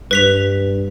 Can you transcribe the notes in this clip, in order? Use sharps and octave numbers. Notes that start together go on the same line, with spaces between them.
G2 B4 B6 F7